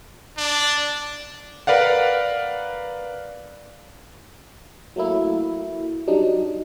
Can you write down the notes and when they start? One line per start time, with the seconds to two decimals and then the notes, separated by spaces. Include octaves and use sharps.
0.37 D4
1.67 A#4 B4 D5 F5 F#5
4.96 F#3 A3 A#3 E4
6.08 F#3 G3 D4 D#4